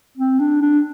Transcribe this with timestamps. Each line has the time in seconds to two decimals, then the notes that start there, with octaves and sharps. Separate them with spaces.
0.18 C4
0.40 D4
0.62 D4